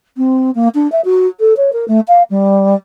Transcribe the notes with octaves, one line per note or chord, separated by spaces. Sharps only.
C4
A#3
D4
E5
F#4
A4
C#5
A#4
A3
F5
G3